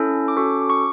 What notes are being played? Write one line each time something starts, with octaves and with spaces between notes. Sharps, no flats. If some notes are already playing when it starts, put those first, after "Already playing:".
Already playing: C#4 E4 A4
D6
C#4 F#4 A4 C#6
D6
C#6